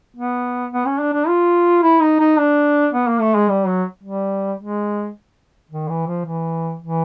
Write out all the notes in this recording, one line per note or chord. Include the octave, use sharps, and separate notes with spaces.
B3
B3
C#4
D4
D4
F4
E4
D#4
D#4
D4
B3
A#3
A3
G#3
G3
F#3
G3
G#3
D#3
E3
F3
E3
E3